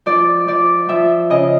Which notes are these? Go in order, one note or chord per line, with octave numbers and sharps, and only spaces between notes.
F3 D5
F3 D5
F3 E5
C#3 D#5